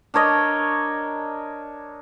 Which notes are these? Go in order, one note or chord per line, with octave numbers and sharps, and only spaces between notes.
D4 A#4 C#5 D#5